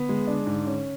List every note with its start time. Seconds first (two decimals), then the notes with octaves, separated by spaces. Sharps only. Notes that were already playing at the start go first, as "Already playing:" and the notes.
Already playing: D3 B3
0.09 G#3
0.27 D4
0.47 G#2
0.66 C#4